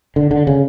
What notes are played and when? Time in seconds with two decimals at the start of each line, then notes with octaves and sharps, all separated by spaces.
0.16 D3
0.31 D3
0.47 C#3